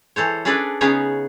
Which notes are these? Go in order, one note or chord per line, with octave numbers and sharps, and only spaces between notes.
E3 A4 C5 C#5
C#4 D4 G#4 A4 B4 D5
C#3 B3 C#4 D#4 G#4 C#5